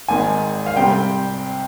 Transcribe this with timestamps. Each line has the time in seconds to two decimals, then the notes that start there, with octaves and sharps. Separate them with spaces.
0.08 G#1 G#2 D#3 G#5
0.66 F5
0.75 C2 C3 G3 C4 G5